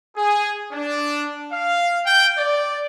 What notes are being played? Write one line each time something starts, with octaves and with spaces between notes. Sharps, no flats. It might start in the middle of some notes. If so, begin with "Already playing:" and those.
G#4
D4
F5
G5
D5